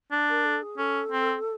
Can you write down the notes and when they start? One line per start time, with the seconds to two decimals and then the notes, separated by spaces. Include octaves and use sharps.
0.12 D4
0.29 A#4
0.45 A4
0.62 G#4
0.78 C#4 A4
1.12 C4